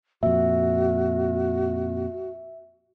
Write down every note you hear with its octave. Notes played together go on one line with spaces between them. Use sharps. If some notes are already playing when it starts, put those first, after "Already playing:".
F2 A#2 F#4 E5